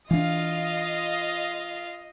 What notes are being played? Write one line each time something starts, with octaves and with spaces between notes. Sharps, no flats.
E3 D4 F4 D#5 F5